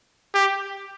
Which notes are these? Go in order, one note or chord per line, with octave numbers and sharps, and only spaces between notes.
G4